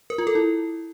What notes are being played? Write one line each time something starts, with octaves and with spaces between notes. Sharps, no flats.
A#4
F4
A4
E4